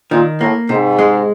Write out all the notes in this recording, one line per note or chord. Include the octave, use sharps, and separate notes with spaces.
A#2 D#3
A2 A#3
G#2 C3
G#3